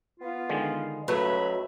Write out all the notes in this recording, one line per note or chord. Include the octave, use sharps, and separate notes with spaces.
B3 F4
D3 D#3 G#3
C#2 F#3 A3 B4 E5 B5